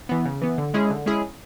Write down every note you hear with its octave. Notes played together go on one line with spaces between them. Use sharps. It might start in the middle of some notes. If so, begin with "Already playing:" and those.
E3 B3
C#3
E3 B3
D3
G#3 C#4 E4 G#4
D3
G#3 C#4 E4 G#4